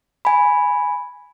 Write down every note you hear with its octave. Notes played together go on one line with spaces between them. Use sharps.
G#5 B5